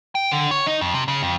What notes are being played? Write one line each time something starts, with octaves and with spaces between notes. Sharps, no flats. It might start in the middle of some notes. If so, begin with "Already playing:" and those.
G5
D3
C#5
D#4
F2
C3
C#3
F2